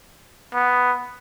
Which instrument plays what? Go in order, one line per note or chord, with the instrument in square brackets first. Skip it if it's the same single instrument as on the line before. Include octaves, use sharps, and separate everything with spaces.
[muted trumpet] B3